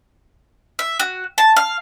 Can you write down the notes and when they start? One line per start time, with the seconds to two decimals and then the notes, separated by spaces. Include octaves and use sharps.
0.79 E5
1.00 F#4
1.38 A5
1.56 F5